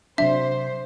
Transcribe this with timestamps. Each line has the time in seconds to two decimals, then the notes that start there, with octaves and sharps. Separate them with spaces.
0.18 C3 F#3 D4 C5 E5